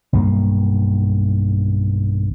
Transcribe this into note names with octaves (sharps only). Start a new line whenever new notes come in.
B1 G2 D#3 A#3